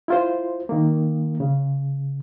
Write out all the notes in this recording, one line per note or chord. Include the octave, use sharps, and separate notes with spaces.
E4 F4 C5
D#3 A#3
C#3